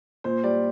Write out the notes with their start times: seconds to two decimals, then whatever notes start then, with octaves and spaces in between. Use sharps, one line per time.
0.24 A#2 C5
0.43 G3 D5